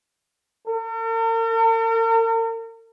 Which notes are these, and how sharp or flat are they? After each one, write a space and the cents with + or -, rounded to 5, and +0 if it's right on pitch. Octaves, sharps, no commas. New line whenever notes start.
A#4 -45